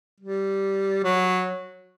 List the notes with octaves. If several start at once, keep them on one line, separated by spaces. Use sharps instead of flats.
G3
F#3